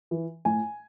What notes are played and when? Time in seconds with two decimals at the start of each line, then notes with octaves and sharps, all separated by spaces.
0.11 E3
0.45 A2 G#5